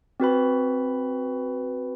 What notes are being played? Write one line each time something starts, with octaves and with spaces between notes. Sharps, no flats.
C4 F#4 B4 B5